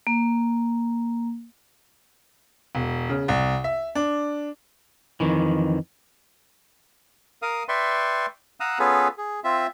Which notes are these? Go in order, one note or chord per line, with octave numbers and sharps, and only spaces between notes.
A#3
E1
C#3
C2
E5
D4
F2 D#3 E3
A#4 F5 D#6
B4 D5 E5 G5 C6 C#6
F5 F#5 A#5 D#6 E6 F#6
B3 C#4 F4 G#4 A4 B4
G#4
C4 F4 E5